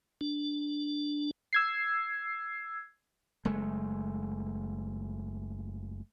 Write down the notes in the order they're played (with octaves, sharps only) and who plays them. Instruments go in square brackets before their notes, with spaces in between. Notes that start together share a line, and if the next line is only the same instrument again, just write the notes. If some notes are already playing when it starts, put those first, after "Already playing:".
[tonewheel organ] D4
[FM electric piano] E6 G#6 C7
[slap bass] F#1 G#3 A3